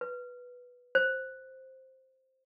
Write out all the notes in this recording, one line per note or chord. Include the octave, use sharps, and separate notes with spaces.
B4
C5